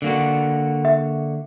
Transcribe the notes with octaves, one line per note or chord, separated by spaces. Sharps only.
D3 A#3 F#4
E5